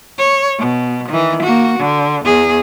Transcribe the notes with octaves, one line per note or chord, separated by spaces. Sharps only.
C#5
B2
D#3 E3
A#3 F#4
D3
E2 G#4